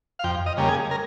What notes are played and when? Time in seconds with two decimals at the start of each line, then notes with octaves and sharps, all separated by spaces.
0.19 F5
0.24 F2 G5
0.46 D#5
0.57 C#3 G3 A#3
0.69 G#4
0.91 A#4